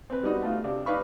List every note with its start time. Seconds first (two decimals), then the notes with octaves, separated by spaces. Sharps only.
0.10 C4 B4
0.23 G3 B3 D#4 F#4
0.43 A3 F4
0.64 C3 D4
0.86 D4 D#4 B4 F5 B5 C#6